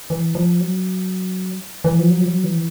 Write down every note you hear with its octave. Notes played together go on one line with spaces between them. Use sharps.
E3
F3
F#3
E3
F3
F#3
F3
F#3
E3